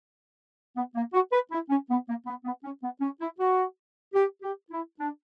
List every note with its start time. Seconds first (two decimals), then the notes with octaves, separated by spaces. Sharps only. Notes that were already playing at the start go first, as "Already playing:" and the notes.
0.76 B3
0.94 A#3
1.13 F#4
1.32 B4
1.51 E4
1.70 C#4
1.89 B3
2.07 A#3
2.26 B3
2.45 B3
2.64 C#4
2.82 B3
3.01 C#4
3.20 E4
3.39 F#4
4.14 G4
4.42 G4
4.71 E4
4.98 D4